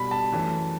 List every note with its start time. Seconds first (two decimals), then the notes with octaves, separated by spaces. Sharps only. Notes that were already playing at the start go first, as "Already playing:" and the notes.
Already playing: B2 G3 B5
0.11 A5
0.31 F#2 E3 A3